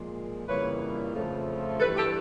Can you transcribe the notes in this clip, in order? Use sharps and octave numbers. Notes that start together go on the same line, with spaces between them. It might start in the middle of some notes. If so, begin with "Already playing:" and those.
Already playing: A#2 F3 G#3
F2 C#3 E3 G3 A#3 B4 C#5
F2 C#3 F3 A3
G2 E3 A3 A4 B4
G4 A4